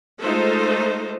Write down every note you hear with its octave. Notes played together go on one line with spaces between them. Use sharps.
G#3 A3 D#4 F4 A4 C5